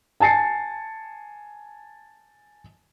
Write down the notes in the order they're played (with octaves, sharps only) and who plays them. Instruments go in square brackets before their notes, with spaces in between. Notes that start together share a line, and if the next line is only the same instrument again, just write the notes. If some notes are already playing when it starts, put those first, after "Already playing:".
[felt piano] G#5 A5 A6 C7 C#7